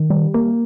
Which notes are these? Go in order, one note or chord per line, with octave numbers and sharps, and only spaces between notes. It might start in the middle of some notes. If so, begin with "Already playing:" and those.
Already playing: D#3
G3
A#3